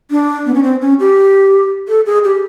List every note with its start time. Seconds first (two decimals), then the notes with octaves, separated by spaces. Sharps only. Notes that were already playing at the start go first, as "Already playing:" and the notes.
0.11 D4
0.46 B3
0.54 C#4
0.63 C4
0.81 C#4
1.00 G4
1.88 A4
2.06 G#4
2.24 G4